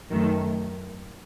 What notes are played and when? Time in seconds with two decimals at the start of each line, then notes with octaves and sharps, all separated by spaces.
0.11 F#2 D#3 A3